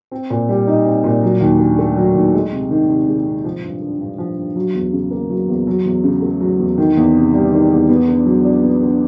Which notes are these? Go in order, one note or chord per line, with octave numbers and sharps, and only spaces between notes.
C4
A#2
G3
D#4
C4
A#2
F#3
D#2
D3
A3
F#3
D#2
G#3
C3
D#3
C3
G#3
C3
F3
G2
D3
G2
F3
G2
F#3
E2
C#3
A#3
F#3
E2
F#3
E2
C#3
A3
F#3
E2
D#3
E2
C3
G3
D#3
E2
B3
D3
F#3
D4
B3
D3